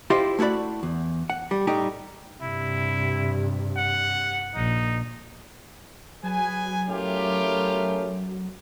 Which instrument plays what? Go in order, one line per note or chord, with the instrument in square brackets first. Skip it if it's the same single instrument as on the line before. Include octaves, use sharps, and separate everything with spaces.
[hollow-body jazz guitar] E4 F4 G4 C5 D#5 F5
A3 E4 F#4 D5 B5
E2
F#5
G3
A2 G3 A3 D#4 G4
[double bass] G2 C3 [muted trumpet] E4
[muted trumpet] F#5
[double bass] A#1 [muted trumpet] D#4
[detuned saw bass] F#3 [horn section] G#4 B4 G#5
[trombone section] A3 C#4 A#4 [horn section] E4 F4 G4